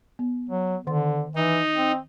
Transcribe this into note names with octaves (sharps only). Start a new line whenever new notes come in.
B3
F#3
D3 D#3 F#5 C6
E3 D#4
C4